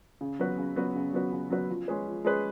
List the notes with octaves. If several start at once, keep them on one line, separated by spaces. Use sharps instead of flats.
C#3
F#3 B3 F#4 B4
C#3
F#3 B3 F#4 B4
C#3
F#3 B3 F#4 B4
C#3
F#3 B3 F#4 B4
F3
G#3 C#4 G#4 B4
F3
G#3 C#4 G#4 B4